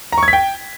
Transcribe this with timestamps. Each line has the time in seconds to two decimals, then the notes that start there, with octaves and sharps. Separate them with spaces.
0.12 A#5
0.18 C#6
0.23 G#6
0.28 B6
0.33 G5